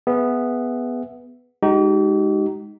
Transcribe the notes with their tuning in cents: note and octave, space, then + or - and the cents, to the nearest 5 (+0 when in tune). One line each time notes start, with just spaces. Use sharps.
B3 +0 G#4 +0 E5 +5
G#3 +0 D#4 +0 G4 -45